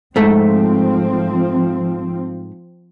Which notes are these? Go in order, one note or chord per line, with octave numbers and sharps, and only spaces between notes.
G#2 F3 A3 C4